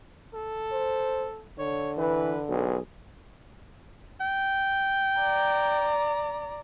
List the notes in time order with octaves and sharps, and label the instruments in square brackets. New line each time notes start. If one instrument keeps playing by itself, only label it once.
[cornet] A4
[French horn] C5
[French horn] D3 [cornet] C#5
[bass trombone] E3 [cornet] B4
[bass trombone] B1 [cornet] G#4
[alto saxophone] G5
[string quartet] D5 A#5